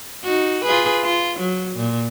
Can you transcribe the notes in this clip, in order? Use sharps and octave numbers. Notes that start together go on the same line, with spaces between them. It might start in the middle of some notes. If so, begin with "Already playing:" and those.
D#4 F#4
F4 G#4 B4
F4
F#3
A#2